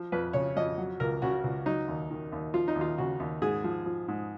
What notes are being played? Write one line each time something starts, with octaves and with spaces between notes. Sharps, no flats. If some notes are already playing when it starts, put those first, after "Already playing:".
Already playing: F3
F2 B4
C#3 C#5
F2 D#5
F#3
C#2 A#4
C#3 F#4
C#2
F#3 D#4
D#2
D#3
D#2
F3 F4
D#4
D#2
F4
C#3 F#4
D#2
G#2 G#4
F3
F3
G#2